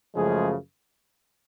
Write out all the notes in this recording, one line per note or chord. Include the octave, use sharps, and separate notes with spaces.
F#2 C#3 F3 G#3 A3 G#4